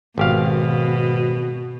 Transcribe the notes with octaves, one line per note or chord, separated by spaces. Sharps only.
G#1 B2 G4 F5